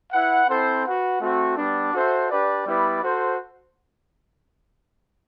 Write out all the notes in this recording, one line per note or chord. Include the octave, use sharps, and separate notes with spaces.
E4 B4 F#5
C4 E4 A4 C5
F#4 B4 F#5
A3 C4 F#4
G3 B3 D4
F#4 A4 C5 E5
D4 G4 B4 D5
G3 B3 E4 B4 D5
F#4 A4 C5